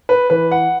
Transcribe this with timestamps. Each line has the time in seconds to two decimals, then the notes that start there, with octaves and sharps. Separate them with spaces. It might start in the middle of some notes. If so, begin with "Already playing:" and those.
0.09 B4
0.30 E3 B4
0.52 F#5